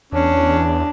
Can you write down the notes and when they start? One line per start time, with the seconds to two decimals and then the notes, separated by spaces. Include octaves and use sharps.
0.13 E2 C#4 D4